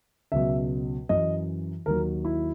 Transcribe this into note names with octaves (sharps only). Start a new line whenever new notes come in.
C#2 B2 F#3 E5
F#2 E3 D#5
D#2 D#3 F#3 A#4
E4